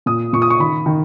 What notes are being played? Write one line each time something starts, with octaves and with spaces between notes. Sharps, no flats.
A#2 D#6
A#2 C#6
D#6
C#6
D#3 B5
D#3